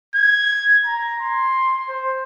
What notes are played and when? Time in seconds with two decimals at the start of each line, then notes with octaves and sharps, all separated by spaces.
0.15 G#6
0.86 A#5
1.22 C6
1.89 C5